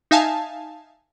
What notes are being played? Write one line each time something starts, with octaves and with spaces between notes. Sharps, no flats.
D#4 E5 F5 G#5 A5